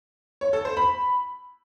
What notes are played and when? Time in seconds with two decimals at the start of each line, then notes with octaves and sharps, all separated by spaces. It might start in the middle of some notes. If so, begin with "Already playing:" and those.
0.41 C#5
0.53 A4
0.65 C5
0.77 B5